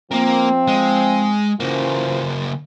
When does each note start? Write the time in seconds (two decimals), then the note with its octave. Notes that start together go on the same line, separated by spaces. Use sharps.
0.11 F3 A#3 C4 A#4
0.68 G#3
1.60 C#3 E3 A#3 F4 C5